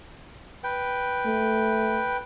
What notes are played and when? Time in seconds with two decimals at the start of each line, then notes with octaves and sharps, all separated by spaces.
0.64 B4 G5
1.25 A3